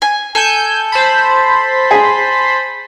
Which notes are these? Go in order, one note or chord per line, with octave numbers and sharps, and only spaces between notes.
G#5
A4 G#5 G6
C5 A5 B5
G#4